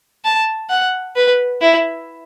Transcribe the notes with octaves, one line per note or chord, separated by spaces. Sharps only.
A5
F#5
B4
E4